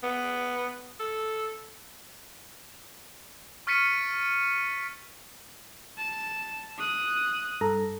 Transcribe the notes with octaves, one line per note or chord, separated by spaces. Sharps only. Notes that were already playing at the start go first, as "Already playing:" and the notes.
B3
A4
C#6 F6 A6 B6 C#7 D#7
A5
D#6 F#6
G2 A4 A#5